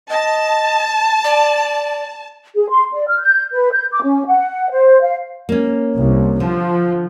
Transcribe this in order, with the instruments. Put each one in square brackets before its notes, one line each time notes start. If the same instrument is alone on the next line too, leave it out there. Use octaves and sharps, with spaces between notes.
[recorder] D#5 [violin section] A5
[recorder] D5
[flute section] G#4
C6
D5
F6
G6
B4
G6
D6
C#4
F#5
C5
F5
[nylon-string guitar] A#3 C#4
[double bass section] C2
[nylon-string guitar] D3 [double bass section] F3